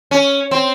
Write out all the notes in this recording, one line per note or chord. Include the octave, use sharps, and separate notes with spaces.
C#4
C4